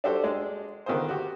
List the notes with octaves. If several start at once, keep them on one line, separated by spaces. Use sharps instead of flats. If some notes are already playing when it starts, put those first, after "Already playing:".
D4 F#4 G4 A4 C5
G#3 D4
D3 D#3 B3 F4 G#4 C5
F#4 G4